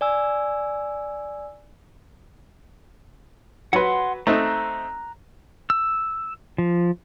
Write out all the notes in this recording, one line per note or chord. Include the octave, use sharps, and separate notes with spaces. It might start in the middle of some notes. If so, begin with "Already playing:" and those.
D5 G#5 E6
F#3 B4 F#5 B5 C6
A3 C4 D#4 A#5 F#6
E6
F3